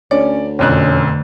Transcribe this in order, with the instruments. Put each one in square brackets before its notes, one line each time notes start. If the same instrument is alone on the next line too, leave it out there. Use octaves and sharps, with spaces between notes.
[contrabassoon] D2 [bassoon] C#4 [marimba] C#5 [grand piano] D5
[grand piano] E1 F2 F#6 [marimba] D3 A3 [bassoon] C#4